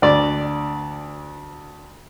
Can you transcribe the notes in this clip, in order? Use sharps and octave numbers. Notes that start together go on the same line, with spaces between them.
D2 D5